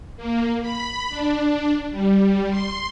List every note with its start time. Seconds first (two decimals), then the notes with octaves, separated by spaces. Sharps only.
0.17 A#3
0.61 B5
1.10 D4
1.91 G3
2.50 C6